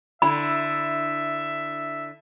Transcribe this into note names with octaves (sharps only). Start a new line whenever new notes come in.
D3 E4 E5 B5